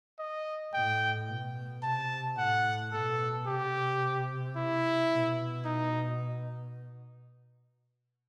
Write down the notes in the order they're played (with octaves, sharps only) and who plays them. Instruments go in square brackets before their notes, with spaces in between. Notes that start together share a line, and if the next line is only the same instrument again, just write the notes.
[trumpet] D#5
[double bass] A2 [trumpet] G5
[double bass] B2
[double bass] C3 [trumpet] A5
[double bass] A2 [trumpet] F#5
[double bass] B2 [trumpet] A4
[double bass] C3 [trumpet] G4
[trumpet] E4
[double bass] B2
[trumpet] D#4